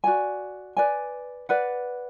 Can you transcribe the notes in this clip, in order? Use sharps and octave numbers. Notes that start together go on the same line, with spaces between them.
F#4 D5 G#5
B4 D5 G#5
B4 D5 F#5